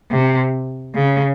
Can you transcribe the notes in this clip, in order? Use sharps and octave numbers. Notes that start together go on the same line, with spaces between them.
C3
C#3